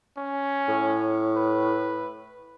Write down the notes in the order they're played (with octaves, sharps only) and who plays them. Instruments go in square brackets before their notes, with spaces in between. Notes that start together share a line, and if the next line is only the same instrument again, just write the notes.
[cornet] C#4
[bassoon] A2
[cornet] B4